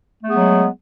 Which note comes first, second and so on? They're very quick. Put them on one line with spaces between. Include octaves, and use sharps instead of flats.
A3 B3 G#4 G#3 F#3